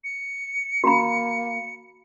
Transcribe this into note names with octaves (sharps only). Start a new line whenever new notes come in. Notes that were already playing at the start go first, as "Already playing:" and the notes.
C#7
A#3 F#4 A#5 B5